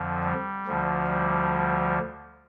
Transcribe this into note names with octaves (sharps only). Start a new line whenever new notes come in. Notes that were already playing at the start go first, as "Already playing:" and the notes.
Already playing: F2 D3 F3
G3
D2 D3 F3
G3